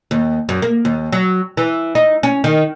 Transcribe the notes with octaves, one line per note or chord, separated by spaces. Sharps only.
D#2
F#2
A#3
D#2
F#3
E3
D#4
C#4
D#3